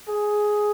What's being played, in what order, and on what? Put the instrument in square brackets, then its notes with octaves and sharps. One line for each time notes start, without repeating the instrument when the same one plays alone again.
[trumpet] G#4